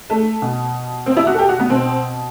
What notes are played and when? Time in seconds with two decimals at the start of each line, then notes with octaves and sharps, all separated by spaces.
0.10 A3
0.42 B2
1.06 C4
1.17 E4
1.27 F#4
1.34 A4
1.38 G4
1.49 F#4
1.59 B3
1.70 B2 C4